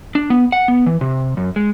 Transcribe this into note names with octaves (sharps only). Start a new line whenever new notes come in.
D4
B3
F#5
B3
E3
C3
F#2
G#3